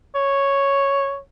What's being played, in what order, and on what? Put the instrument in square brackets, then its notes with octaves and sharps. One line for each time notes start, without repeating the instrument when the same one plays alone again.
[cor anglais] C#5